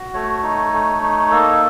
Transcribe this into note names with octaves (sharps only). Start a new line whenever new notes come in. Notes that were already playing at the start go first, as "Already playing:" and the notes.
Already playing: F#4
A3 C#5
D#4
A3
D#4
A#3 A4